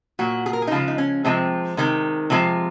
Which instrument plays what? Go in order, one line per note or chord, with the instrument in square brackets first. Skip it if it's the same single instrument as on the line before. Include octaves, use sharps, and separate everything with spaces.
[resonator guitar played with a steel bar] A#2 F#3 F#4
G#4
A#4
G#4
D#4
C#3 F3 G#3 F4
D#4
C#4
C3 F3 G#3 C4
C3 D#3 G#3
C3 F3 G#3